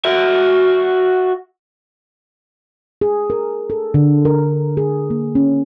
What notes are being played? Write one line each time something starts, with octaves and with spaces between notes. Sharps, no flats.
F#4 E5
G#4
A#4
A4
D3
A#4
G#4
A#3
C#4